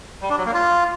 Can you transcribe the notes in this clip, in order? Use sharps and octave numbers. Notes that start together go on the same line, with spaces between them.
G3
D4
F#3
A#3
F4